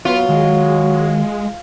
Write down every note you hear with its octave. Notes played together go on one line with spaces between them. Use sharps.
F#3 B3 F4
D#3 G#3